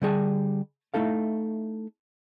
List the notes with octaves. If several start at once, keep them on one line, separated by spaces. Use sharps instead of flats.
D3 G3 G#4 A5
A3 D#4 E4 A4 F5